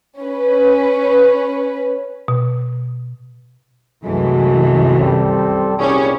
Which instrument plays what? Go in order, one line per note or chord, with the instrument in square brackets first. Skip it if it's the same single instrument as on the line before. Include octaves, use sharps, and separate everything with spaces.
[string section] C#4 B4
[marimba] B2
[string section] C2 F#2 E3 [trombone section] F#3 G#3 A3
[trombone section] G3 C4 A4
[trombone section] C2 A#2 G#4 [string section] G3 C#4